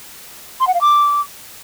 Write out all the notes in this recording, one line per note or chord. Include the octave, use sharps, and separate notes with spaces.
C6
F#5
F5
D6